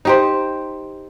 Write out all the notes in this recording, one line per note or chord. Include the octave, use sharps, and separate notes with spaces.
D#4 G4 C5